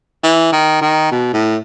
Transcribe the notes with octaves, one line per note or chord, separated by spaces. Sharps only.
E3
D#3
D#3
B2
A2